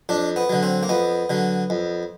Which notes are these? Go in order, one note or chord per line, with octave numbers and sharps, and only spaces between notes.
F2 D4
B3
D3 F#3
C4
A#3
F2 B3
D3 F#3
F2